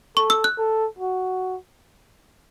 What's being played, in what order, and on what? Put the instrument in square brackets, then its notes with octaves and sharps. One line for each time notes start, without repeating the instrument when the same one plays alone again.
[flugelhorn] A4 [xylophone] C#6
[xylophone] E6
F#6
[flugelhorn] A4
F#4